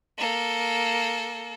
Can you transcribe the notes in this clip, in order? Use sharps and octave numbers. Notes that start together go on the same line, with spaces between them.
A#3 A4